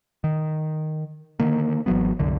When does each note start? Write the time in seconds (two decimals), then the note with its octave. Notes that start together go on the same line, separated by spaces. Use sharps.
0.24 D#3
1.39 D3 D#3 A#3
1.86 G#1 E3 F#3 B3
2.19 C2 F#2 D3